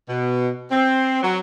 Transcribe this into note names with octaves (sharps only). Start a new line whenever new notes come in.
B2
C4
F#3